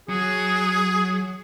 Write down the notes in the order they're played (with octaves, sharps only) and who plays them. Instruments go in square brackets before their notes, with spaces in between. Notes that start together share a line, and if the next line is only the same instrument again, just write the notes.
[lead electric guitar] F#3 [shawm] G#4